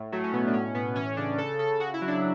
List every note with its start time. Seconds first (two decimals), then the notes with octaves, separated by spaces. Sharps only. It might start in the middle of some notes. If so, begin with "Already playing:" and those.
Already playing: A2
0.12 F#3 A3
0.24 C#4
0.33 B2 B3
0.47 D4
0.54 A2 C#4
0.75 A2 B3
0.96 E3 C#4
1.17 C#3 D4
1.38 C#3 A4
1.59 C#3 A4
1.80 C#3 F#4
1.94 E4
2.01 F#3
2.08 D4